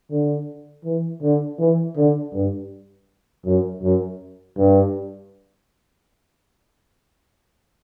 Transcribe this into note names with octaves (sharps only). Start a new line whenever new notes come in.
D3
E3
D3
E3
D3
G2
F#2
F#2
G2